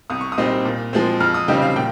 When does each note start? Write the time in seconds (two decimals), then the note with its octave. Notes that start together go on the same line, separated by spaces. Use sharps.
0.10 C2 D#6
0.21 C#6
0.32 D#6
0.38 A#2 G3 C4 D#4
0.65 A#2
0.93 F3 G#3 C4
1.20 F2 F6
1.34 D#6
1.48 C#3 G3 C4 D#4 G5
1.62 F5
1.76 A#2 G5